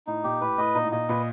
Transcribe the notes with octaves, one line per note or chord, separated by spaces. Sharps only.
A2 D#4
A#2 G4
A2 B4
A2 D#5
A#2 D#4
A2
A#2 D#5
A#2 B4